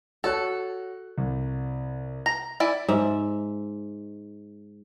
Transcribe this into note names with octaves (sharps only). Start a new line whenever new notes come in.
F#4 A4 C#5 F#6
C2
A#5
E4 D5 G#5
G#2 E5